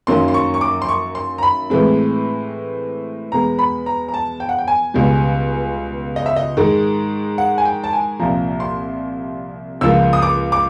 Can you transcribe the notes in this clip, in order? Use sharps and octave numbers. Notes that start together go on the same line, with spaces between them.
F#2 D#3 F#3 A#3 C#4 C6
C6
C#6
C#6
D6
C6
C#6
C6
A#5
B5
A2 E3 G#3 C4
E2 B2 G#3 B3 A#5
B5
A#5
A#5
A5
G5
F#5
G5
G#5
C#2 B2 G3
D#5
E5
D#5
G#2 D#3 G#3
F#5
G#5
G5
A5
G#5
C2 A#2 F3 A#5
C6
C#2 C#3 F3 A#3 E6
D#6
D6
D6